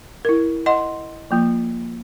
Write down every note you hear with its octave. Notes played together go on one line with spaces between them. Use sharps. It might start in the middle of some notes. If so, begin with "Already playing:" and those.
E4 A#4
D#5 F#5 C6
F3 A#3 F4